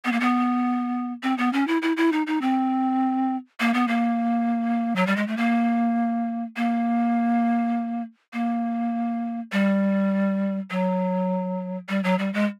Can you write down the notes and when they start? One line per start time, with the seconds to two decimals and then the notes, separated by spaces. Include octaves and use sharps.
0.05 B3
0.12 A#3
0.20 B3
1.23 C4
1.38 B3
1.53 C#4
1.68 E4
1.82 E4
1.97 E4
2.12 D#4
2.27 D#4
2.42 C4
3.60 A#3
3.74 B3
3.88 A#3
4.96 F#3
5.07 G3
5.16 G#3
5.27 A3
5.37 A#3
6.57 A#3
8.33 A#3
9.52 G3
10.71 F#3
11.89 G3
12.04 F#3
12.19 G3
12.34 G#3